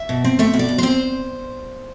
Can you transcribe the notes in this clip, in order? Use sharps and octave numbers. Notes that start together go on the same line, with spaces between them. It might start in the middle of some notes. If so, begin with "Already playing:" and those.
Already playing: E5
B2
C4
A3 E5
B2
D5
B2
C4 C5